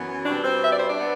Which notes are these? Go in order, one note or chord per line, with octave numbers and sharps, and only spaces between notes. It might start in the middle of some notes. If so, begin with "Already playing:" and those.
Already playing: F#2 E3 B3
B2 G3 C4 D4
C4 C5
E5
D5
C5
D4 D5
B3